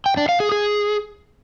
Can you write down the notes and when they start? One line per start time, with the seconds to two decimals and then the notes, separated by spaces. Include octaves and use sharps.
0.06 G5
0.17 D4
0.29 F5
0.40 G#4
0.52 G#4